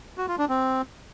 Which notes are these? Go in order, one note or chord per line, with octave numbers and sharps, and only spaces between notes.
F#4
F4
D4
C4